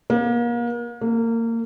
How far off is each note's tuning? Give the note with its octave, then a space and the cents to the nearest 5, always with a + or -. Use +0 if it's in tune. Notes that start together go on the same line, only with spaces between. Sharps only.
A#3 +35
A#3 -25